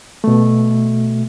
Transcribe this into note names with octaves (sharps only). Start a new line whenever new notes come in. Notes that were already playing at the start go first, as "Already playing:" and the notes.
B2 A3